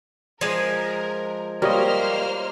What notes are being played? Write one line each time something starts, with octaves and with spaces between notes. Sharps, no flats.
F3 G#3 A#4
G3 A#3 A#4 C5 C#5 D#5 F6